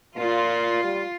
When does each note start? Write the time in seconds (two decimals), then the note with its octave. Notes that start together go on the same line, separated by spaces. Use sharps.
0.17 A#2 F4
0.84 G3